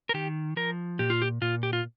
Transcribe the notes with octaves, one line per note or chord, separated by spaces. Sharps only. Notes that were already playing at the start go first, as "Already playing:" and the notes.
A#4
D#3 G4
F3 A#4
A#2 G4
F4
G4
A#2 F4
G4
F4